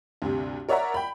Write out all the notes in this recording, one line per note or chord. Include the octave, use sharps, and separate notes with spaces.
D2 G2 C3
A#4 C#5 D5 E5 F#5 A#5
G5 B5